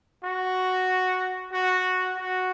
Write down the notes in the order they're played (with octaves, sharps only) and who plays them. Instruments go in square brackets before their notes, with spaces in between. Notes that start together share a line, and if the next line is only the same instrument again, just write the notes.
[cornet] F#4
F#4
F#4